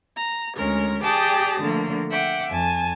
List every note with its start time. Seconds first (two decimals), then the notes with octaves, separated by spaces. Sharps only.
0.17 A#5
0.56 D2 G#3 C#4 A#4
1.03 G4 G#4 D5 G5 A5 D#6
1.60 D3 F3 A3 A#3
2.10 E5 F#5 G5 D6
2.50 F2 G#5 A5